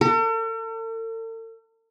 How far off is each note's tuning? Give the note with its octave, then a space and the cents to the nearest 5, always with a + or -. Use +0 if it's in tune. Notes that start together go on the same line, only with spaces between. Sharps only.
A4 +45